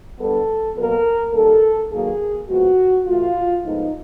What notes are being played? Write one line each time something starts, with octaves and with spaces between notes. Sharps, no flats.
D3 G3 B3 A4
B2 F#3 A#3 A#4
D#3 G3 A#3 A4
D#3 F#3 A#3 G#4
A#2 F3 G#3 B3 F#4
A2 E3 A3 F4
A2 F3 G#3 B3 D#4